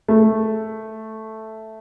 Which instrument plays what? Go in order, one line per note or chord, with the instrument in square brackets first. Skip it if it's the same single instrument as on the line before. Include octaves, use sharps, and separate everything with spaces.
[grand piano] A3